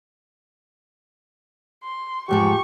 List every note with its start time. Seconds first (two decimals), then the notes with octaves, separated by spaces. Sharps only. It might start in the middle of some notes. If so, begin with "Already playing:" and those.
1.84 C6
2.29 E2 G#2 F3 G4 C#6